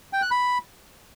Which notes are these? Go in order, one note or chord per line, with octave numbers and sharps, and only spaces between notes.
G5
F#6
B5